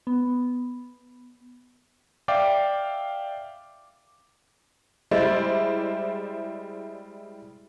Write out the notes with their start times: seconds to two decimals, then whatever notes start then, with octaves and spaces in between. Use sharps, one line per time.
0.07 B3
2.28 D5 E5 F5 G5 D6
5.11 G3 G#3 E4 C5 D5